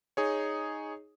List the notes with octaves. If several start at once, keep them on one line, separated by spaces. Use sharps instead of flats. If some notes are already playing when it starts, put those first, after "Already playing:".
D#4 G#4 C#5